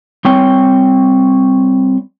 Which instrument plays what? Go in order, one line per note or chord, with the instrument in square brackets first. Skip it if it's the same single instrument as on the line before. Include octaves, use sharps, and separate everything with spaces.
[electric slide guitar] G3 C4 C#5 G5 G#5